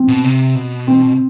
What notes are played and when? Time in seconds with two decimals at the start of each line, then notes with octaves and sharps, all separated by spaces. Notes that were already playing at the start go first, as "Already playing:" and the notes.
Already playing: C4
0.08 B2
0.24 C3
0.55 B2
0.87 C4